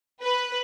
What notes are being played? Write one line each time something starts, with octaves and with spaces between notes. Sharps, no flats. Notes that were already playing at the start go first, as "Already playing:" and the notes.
B4